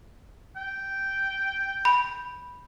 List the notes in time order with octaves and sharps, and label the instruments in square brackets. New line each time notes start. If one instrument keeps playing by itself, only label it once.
[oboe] G5
[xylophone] B5